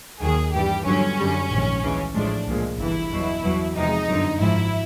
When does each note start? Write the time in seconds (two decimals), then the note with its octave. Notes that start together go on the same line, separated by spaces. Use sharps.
0.21 D#2 D#3 F#3 G#4
0.53 G2 E3 G3 G4
0.85 G1 G2 D3 F#3 C#4
1.18 F#2 D3 G3
1.50 A#1 G#2 D#3
1.82 D2 C#3 E3 G#3
2.14 A1 A2 F3 G#3 D4
2.46 C2 A#2 F3 G#3
2.79 G1 G2 E3 E4
3.11 E2 B2 F#3
3.43 E2 B2 F#3
3.76 E2 C3 F3 G#3 D#4
4.08 G1 F#2 D3
4.40 G#1 G#2 F3 E4